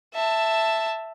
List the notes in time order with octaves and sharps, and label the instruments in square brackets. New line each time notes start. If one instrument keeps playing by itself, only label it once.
[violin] E5 A5